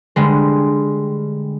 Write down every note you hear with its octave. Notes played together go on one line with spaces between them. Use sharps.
D3 G3 G#3